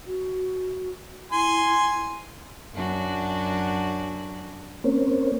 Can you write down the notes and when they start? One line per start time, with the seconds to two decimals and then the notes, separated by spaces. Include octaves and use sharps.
0.07 F#4
1.32 E4 G#5 C6
2.74 F#2 D4 F#4
4.84 A#3 C4 C#4